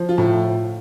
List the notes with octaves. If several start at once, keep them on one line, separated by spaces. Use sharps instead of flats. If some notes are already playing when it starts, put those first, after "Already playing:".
Already playing: F3
F4
A2